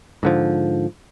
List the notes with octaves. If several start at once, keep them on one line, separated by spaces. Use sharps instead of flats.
G#2 D3 F3